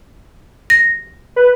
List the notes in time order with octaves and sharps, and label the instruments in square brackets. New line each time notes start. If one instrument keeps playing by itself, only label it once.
[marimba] A#6
[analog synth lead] B4